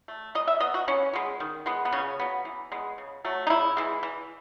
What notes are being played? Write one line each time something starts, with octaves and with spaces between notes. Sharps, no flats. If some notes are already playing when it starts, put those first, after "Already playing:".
A3
E3 D#5
E5
B3 D#5
F#4
E3 C#4
G#3 B3
D#3
G#3 B3
B3
C#3 C#4
F#3 B3
E3
G#3 B3
C#3
F#3 A3
D#4
C#3 E4
E3 G#3
E3